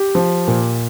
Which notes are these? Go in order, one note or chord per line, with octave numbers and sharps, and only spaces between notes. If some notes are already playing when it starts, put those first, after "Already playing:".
Already playing: G4
F3
A#2